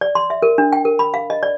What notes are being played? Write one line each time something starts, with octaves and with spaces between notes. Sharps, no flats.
D5
C6
E5
A#4
D4
G5
A#4
B5
F5
D#5
D5